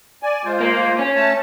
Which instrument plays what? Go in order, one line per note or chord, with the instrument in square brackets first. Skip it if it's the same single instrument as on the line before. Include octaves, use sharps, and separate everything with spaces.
[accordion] D5 G#5
G#3 F4 C5
[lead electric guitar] A#3
C#4
[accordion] A3 A5